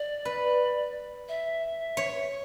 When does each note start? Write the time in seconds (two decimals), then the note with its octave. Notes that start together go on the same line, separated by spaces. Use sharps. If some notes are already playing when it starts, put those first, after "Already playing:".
Already playing: D5
0.25 B4
1.28 E5
1.97 C#5